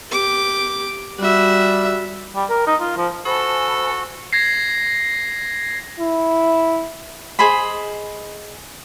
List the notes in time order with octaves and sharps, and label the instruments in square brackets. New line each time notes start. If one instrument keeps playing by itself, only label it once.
[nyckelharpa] G4 D6
[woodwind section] G3 [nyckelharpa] F#4 E5
[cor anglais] G3
A#4
D#4
F4
F3
[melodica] F#4 [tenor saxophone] A4 [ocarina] C5 [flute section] G#5 A5 B5
[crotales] G#6 A#6 C7
[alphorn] E4
[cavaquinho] G#4 C5 D#5 B5